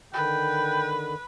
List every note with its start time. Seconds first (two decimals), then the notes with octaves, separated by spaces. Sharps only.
0.14 D3 D#3 B4 G5